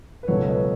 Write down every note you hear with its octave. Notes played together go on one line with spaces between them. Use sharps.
B4
C#2 B2 F#3 B3 A4 C#5
B4 D#5